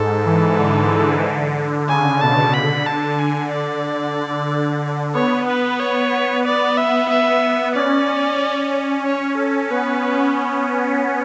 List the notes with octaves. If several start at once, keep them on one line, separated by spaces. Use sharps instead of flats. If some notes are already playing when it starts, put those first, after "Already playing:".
Already playing: G#2 A4
E3
D3
C#3 G#5
B2 A5
D3 B5
A5
G#5
D5
B3 C#5
B4
C#5
B3 D5
E5
E5
C#4 D5
C#5
A4
B3 B4